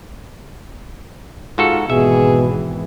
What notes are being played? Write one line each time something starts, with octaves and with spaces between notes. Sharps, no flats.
G#2 F4 F#4 A4
G#1 B2 E3 G#4 E5